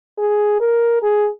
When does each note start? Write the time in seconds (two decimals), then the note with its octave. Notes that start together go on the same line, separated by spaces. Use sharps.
0.18 G#4
0.60 A#4
1.02 G#4